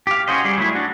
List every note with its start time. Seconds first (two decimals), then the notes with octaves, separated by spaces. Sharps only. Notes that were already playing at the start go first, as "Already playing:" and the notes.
0.07 G4 F5
0.28 C#4 F#4 G#4 C5 D#5
0.45 G3 G#4
0.58 F#3 A3 E4
0.75 D4 F#4